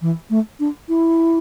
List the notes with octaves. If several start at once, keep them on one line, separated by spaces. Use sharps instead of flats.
E3
A3
D4
E4